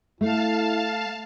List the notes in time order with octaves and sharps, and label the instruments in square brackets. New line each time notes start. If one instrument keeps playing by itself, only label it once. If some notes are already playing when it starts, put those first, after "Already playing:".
[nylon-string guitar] A3 [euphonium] E4 [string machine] F5 A5